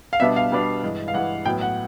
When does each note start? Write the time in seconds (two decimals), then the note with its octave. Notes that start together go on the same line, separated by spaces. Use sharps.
0.13 F5
0.20 B2 G3 B3 D4 E5
0.36 F5
0.52 B2 G3 B3 D4
0.82 G2 E3 G#3
1.08 F5
1.14 G2 E3 G#3 F#5
1.45 A2 F#3 B3 G5
1.61 F#5